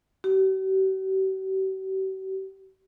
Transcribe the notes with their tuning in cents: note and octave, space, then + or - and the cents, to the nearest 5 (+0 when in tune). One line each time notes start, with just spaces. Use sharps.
G4 -45